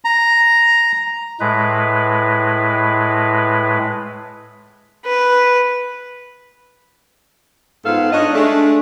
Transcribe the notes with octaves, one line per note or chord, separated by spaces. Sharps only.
A#5
A2 G#3 B4
B4
G#2 B3 F4 A4 F5
D4 D#4 C#5 D#5
G#3 A3 D4